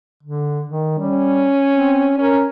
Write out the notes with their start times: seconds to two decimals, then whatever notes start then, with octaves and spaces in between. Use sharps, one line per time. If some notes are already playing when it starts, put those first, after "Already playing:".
0.23 D3
0.68 D#3
0.99 G3 C#4
1.71 C4
2.18 C#4 A#4